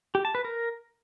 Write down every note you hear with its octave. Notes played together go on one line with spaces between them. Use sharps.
G4
A5
B4
A#4